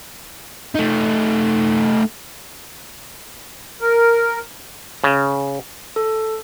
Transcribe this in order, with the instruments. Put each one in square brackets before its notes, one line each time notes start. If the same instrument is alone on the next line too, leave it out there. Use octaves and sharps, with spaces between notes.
[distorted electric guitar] A3 D#4
[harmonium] A#4
[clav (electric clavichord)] C#3
[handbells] A4